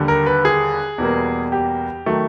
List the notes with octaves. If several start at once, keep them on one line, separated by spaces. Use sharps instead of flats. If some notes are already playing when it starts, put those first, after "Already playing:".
Already playing: D#2 D3 G3
A#4
B4
G#4
E2 B2 G3 A#3
G4
D#3 F#3 A3